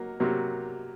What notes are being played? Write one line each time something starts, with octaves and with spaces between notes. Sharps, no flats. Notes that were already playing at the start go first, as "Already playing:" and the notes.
Already playing: F#3 A#3
C3 F#3 A#3